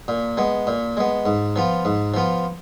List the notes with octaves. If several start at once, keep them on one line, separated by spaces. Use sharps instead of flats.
A#2
G#3 B3
A#2
G#3 B3
G#2
F3 B3 F4
G#2
F3 B3 F4